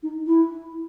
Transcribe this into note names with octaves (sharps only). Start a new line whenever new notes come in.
D#4
E4